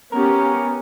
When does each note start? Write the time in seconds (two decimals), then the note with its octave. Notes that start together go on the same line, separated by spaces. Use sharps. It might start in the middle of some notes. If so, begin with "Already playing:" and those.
0.12 B3 C#4 G4 A#4